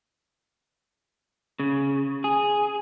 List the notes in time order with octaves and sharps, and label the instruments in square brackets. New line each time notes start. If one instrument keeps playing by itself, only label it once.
[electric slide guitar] C#3
G#4